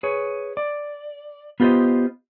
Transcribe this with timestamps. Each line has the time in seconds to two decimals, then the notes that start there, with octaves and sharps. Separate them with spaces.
0.03 G#4 B4 C#5
0.57 D5
1.60 B3 F4 G4 A#4 C5 D#5